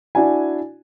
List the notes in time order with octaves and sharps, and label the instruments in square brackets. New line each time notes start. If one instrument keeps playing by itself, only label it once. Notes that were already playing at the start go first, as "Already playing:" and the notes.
[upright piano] D4 E4 F#4 G#5